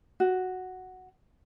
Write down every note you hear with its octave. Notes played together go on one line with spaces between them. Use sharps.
F#4